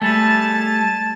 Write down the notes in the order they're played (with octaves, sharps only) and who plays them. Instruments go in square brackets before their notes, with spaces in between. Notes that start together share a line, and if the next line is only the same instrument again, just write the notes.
[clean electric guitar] G3 A3 [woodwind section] G#5 A5